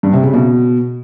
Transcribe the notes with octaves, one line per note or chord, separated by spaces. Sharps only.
G2
C3
C#3
B2